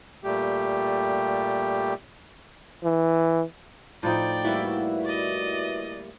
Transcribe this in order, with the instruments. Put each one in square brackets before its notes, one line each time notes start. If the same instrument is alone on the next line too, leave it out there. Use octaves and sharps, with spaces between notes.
[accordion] A#2 G3 A3 G4
[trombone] E3
[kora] A2 F3 D#4 [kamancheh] D5 G5
[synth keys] G3 A#3 E4 [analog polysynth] F#4 B4 E5
[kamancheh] D5 D#5